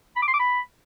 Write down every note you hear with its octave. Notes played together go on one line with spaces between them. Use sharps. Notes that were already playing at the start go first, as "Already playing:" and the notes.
B5
D6
C6
D6
B5